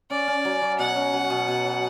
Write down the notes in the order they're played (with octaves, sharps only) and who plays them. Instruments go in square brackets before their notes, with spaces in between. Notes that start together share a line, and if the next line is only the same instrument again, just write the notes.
[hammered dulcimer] C#4 [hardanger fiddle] D5
[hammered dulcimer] C#4
F#3
F#3
[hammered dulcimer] B2 [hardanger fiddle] F#5
[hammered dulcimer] C#4
F#3
B2
B2
F#3